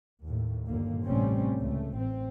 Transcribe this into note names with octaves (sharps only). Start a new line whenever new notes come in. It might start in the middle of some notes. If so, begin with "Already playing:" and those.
D#2 A2
G1 D#2 A#2 D3 A#3
A1 C3 G3 A3 C4 C#4
C#2 A3
A1 C4